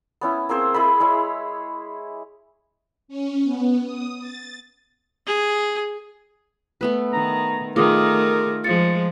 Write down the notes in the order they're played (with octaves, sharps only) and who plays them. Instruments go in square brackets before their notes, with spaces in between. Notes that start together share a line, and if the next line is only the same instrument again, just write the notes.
[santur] B3 C#4 E4
A#3 C4 G#4 C5
E4 G#4 D#5 B5
G#3 E4 C#5
[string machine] C#4
B3
D#6
A6
[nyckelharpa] G#4
[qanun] A3 B3 B4
[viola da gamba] D#3 [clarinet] A#5
[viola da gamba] D#3 A3 [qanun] F4 [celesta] G#4 D6 D#6 [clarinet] A#4
[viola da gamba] F3 G#3 [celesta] A6 C#7